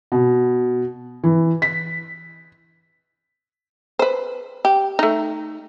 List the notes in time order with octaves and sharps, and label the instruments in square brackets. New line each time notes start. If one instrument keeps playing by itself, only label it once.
[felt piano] B2
E3
B6
[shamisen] B4 C5
G4
A3 D#4